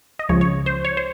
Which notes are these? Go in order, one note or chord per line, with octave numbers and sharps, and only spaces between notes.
D#5
C#2 C#3 F3 C#5
C#5
C5
C#5
C5